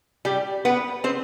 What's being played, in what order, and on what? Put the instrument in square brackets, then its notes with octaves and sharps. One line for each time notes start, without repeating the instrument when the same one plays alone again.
[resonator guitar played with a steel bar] G3 G4
B3 B4
C4 C5